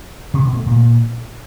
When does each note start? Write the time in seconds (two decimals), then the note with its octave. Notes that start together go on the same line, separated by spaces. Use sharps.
0.34 C3
0.45 B2
0.55 A3
0.66 A#2